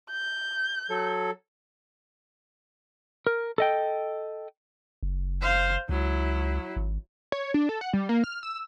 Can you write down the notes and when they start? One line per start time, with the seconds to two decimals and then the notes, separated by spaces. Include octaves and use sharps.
0.11 G6
0.90 F#3 A4
3.27 A#4
3.58 A4 D#5 G5
5.03 F#1
5.42 C5 F5
5.89 C#2 F#3 E4
6.76 G#1
7.32 C#5
7.54 D4
7.69 A4
7.81 F#5
7.93 G3
8.09 A#3
8.24 F6
8.43 E6